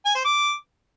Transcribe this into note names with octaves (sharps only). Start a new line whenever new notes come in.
G#5
C5
D6